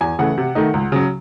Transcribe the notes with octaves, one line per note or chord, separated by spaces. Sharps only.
E2 G#5
C#3 E3 A3 F#5
C3
D#3 A3 D#4
C#2
C#3 F#3